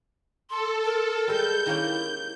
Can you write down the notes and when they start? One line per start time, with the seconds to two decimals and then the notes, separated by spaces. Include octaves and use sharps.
0.50 A4 C6
0.84 A#4
1.28 G3 G#3 G6
1.66 D#3 A#3 C#4 E4